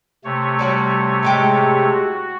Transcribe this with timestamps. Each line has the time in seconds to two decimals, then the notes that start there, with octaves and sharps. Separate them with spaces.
0.25 C3 A3 C#5
0.59 G3 C#4 F#4
1.23 A2 G#3 G4
1.91 F#4